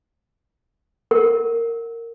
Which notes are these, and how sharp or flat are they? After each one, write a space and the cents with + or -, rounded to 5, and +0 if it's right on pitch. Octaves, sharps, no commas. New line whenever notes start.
A#4 -15 F#5 +0